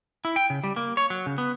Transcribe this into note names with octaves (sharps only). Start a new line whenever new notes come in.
E4
G5
C#3
G3
A#3
C#5
F#3
C#3
B3